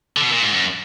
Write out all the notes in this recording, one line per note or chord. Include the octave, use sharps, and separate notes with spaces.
D3
B2
A#2
G#2
F#2